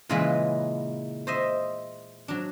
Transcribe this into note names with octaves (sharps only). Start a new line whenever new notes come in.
A#2 C#3 E3 G#3 A#3 B4
C5 D#5 E5
F#3 D4